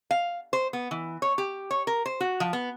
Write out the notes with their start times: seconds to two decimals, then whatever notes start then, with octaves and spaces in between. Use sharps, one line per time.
0.11 F5
0.53 C5
0.73 B3
0.91 E3
1.22 C#5
1.38 G4
1.71 C#5
1.87 A#4
2.06 C5
2.20 F#4
2.40 F3
2.53 B3